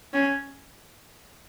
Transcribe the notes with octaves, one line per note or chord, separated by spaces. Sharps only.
C#4